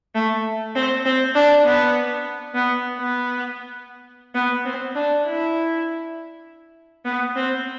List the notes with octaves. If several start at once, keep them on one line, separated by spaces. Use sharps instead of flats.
A3
C4
C4
D4
B3
B3
B3
B3
C4
D4
E4
B3
C4